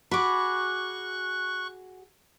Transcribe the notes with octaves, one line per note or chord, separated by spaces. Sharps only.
F#4 G#4 B5 C#6 D6 F#6